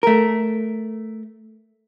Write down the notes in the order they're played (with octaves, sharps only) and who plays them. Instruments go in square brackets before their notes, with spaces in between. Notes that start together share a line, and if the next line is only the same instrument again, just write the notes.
[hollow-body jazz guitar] A3 A#4